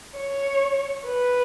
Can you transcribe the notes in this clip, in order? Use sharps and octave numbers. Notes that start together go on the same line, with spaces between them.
C#5
B4